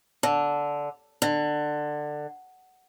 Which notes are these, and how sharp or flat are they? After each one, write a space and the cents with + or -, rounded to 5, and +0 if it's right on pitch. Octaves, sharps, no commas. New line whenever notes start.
D3 -10
D3 +20